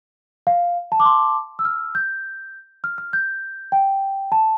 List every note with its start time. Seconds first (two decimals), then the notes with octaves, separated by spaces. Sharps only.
0.47 F5
0.92 A5
1.00 D6
1.06 C6
1.59 E6
1.65 F6
1.95 G6
2.84 F6
2.98 F6
3.13 G6
3.72 G5
4.32 A5